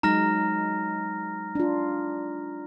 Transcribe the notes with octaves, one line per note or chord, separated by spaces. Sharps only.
F#3 G#3 D#4 A#5 F6 A#6
D4 F4